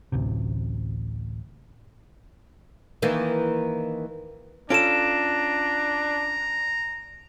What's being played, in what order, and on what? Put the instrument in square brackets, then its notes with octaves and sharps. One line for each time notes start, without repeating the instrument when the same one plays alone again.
[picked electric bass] A1 D2 C3
[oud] D#3 E3 A#3
[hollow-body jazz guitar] C#4 F4 A4 [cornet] D4 [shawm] A#5 [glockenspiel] D7 E7